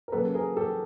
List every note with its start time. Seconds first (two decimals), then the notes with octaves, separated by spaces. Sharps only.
0.08 A#4
0.12 C#3 F#3 A#3 A4 B4
0.34 G#4 A#4
0.56 G4 A4